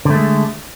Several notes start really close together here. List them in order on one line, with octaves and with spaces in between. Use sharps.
D3 A3 G#3